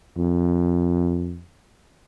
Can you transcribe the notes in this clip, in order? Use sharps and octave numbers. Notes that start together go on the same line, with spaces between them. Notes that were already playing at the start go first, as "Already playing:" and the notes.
F2